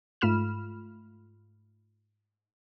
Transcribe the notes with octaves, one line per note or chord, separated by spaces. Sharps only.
G#2 A3 F4 B5 F6 E7